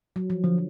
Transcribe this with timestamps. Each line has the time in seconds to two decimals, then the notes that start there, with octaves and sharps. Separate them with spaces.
0.16 F#3
0.30 F3
0.44 D3 F3